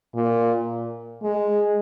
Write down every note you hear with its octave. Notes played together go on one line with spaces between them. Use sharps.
A#2
G#3